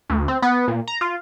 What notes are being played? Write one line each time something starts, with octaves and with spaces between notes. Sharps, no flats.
D2
C4
B3
A#2
A#5
F4